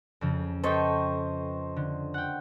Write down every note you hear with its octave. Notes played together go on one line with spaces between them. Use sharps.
F2 C#3 F3
A4 B4 C5 D#5 G5 C#6
D3
F#5 G5